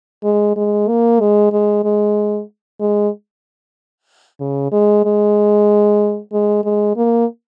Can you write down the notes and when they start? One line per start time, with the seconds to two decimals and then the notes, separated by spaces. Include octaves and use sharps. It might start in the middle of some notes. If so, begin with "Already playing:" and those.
0.24 G#3
0.56 G#3
0.88 A#3
1.20 G#3
1.52 G#3
1.84 G#3
2.80 G#3
4.40 C#3
4.72 G#3
5.05 G#3
6.33 G#3
6.64 G#3
6.97 A#3